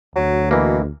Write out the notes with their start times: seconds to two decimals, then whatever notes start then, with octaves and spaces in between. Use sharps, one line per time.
0.15 D2 F#3
0.51 B2 E3 A#3